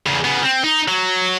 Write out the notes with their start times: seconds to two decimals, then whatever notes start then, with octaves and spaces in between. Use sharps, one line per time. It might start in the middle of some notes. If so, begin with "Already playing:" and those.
0.06 E2 C#3
0.24 C#3 B3
0.44 C4
0.64 D#4
0.88 F#3